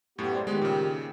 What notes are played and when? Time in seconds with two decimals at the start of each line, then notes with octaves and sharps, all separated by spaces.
0.18 F#2 A2 B3 G4
0.34 G#3 C5 D5
0.47 D#3 G#3 B3 G4
0.61 A#2 C#3